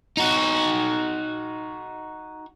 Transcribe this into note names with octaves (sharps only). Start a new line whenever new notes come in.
D#4 F#4